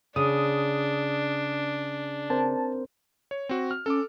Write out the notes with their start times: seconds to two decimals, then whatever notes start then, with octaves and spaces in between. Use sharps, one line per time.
0.16 C#3 D4 D#6
2.30 C4 A#4 C5 A5
3.31 C#5
3.49 C4 F#4
3.71 F6
3.86 C#4 A4 A5 D6